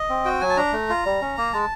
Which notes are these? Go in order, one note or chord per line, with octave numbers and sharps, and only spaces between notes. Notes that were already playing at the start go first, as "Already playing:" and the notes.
Already playing: D#5
C4
F#4 G5
F#3 G#5
A5
D4 A#5
A3
F4
G3
C#4
A#3
G#3 A5